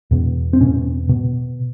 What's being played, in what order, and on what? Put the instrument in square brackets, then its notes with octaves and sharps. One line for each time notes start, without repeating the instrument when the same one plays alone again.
[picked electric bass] E2 B2
C4
E2 B2 C#4
B2